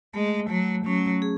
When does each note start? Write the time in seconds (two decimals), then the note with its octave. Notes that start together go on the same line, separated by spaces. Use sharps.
0.14 G#3 A3
0.50 F#3 A3
0.85 F#3 C#4
1.22 G#4